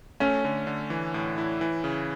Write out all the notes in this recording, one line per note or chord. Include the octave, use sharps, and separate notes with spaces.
A3 C#4
D3
D3
E3
A2
E4
E3
C#3